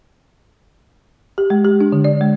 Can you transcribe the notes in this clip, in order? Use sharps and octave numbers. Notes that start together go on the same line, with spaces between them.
G4
G#3
G4
D4
D3
D5
G#3